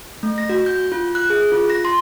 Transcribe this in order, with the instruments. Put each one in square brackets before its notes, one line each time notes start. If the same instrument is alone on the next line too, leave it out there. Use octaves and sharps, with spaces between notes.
[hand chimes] A3
A#6
F#4
G6
F4
F#6
G#4
F4
A#6
C6